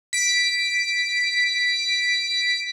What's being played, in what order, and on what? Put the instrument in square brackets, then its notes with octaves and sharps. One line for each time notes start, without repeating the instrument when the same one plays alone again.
[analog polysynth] B6 D7